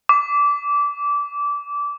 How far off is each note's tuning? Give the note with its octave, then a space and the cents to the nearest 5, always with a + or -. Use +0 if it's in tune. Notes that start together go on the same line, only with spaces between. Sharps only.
D6 -20